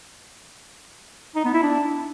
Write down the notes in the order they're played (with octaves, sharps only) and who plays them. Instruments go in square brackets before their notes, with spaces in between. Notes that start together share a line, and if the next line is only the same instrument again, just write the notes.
[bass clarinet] D#4
B3
E4
D4